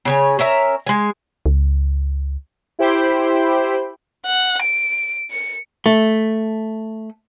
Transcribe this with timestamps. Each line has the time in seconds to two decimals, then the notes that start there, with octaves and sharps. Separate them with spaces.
0.05 C#3 C#5 G#5
0.39 C#4 A#4 E5 A#5
0.87 G#3 G#5
1.46 C#2
2.79 E4 G4 C5 G5 B5
4.26 F#5
4.62 D7
5.31 C#7
5.86 A3